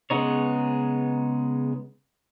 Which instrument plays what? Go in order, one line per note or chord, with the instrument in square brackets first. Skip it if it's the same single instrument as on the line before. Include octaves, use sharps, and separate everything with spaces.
[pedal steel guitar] C#3 G#3 B3 D#4 C#5